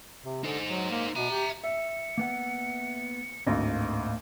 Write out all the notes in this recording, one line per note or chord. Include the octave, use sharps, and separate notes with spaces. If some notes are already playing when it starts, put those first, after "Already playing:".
C3
D3 D#4 C5
F#3
A#3
B2 E5 A#5
G4
E5 C#7
A#3 B3 F#5
G#1 D2 A2 A#3 D#5 F5